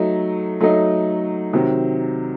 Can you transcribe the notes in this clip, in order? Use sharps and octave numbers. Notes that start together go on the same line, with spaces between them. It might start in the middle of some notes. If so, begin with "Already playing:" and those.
Already playing: F#3 A3 D#4
F#3 A3 D#4
C3 D#3 F#3